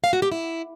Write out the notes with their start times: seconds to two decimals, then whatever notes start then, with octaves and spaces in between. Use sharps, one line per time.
0.04 F5
0.13 F#4
0.22 G4
0.32 E4